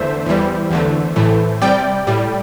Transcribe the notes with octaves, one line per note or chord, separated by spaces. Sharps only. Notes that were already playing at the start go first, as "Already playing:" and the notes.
Already playing: E2 D3 A3 C5 E5
E2 E3 G3
E2 D3 A3
A2 E3 A3
C3 G3 D5 G5
A2 G3